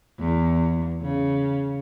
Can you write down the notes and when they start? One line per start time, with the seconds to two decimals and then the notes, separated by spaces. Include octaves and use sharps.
0.19 E2
1.01 C#3